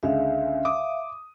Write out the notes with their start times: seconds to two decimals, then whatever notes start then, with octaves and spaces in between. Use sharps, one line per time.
0.03 C#2 D3 G#3 E5 F5
0.65 D6 D#6